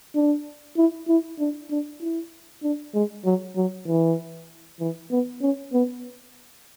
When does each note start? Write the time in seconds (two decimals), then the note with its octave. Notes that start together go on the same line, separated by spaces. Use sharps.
0.15 D4
0.77 E4
1.08 E4
1.39 D4
1.71 D4
2.01 E4
2.63 D4
2.94 G#3
3.25 F#3
3.56 F#3
3.87 E3
4.80 E3
5.11 B3
5.42 C#4
5.73 B3